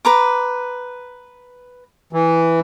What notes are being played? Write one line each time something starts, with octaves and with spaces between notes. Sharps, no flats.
B4 A#5 D6
E3